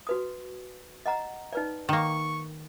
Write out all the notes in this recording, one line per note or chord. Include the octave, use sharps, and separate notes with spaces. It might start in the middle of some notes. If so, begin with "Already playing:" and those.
F#4 B4 D#6
D#5 F#5 A#5
D#4 B4 D5
D#3 A#3 C#6